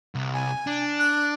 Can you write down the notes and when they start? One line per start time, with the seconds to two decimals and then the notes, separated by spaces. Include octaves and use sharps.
0.15 C2
0.33 G#5
0.67 D4
0.99 F#6